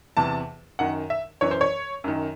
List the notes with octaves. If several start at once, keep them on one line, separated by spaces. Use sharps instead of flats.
E2 C3 E3 A5
F#2 D#3 F#5
E5
F#2 E3 C#5
C5
C#5
F#2 D#3